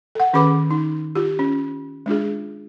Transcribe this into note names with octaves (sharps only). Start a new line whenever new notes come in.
A4 F#5
D#3 C#4 G#4 B4 B5 D6
D#4
F4 G4
C#4
G#3 D4 F4 G#4